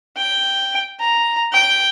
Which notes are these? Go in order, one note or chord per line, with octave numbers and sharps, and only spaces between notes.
G5
A#5
G5